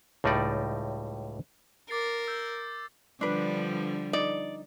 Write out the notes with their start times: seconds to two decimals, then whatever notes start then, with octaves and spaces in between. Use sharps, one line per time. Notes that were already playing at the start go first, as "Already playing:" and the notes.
0.24 C#2 A2 G3 D#4 D5
1.90 A#4 D6 A6 C7
2.28 E6 G6
3.21 D3 F3 G3 D4 B4
4.13 D#4 D5